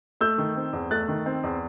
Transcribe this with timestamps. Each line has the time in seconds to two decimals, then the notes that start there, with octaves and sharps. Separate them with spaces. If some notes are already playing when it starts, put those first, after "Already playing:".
0.21 A3 E6 G6
0.38 D#3
0.56 C4
0.73 E2
0.91 A3 F#6 A6
1.08 D#3
1.26 C4
1.43 E2